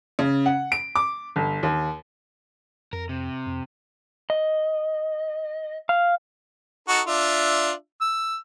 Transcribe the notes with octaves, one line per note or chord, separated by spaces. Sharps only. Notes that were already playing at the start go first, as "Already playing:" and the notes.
C#3
F#5
D7
D6
G1
D#2
F2 A#4
C3
F2
D#5
F5
D#4 F#4 A4
D4 F4 E5
E6